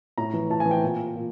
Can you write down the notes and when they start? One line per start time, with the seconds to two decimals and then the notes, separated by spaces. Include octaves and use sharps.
0.18 A2 A#5
0.33 E3
0.50 A2 A5
0.60 G#5
0.66 E3
0.71 G5
0.83 A#2
1.15 A#2